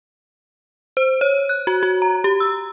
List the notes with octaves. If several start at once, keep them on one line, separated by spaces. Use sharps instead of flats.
C5
C#5
F#6
F#4
F#4
A#5
G4
E6